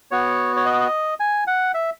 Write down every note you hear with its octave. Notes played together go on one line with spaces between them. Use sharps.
B3 F#4 C#5
C#5
D#5
G#5
F#5
E5